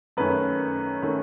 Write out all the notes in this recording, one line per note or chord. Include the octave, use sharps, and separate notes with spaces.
F#2 D#3 A3 C#4 B4
D#3 A3 C#4